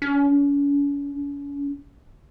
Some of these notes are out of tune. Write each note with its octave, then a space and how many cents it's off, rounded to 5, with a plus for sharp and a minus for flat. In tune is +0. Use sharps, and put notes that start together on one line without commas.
C#4 +40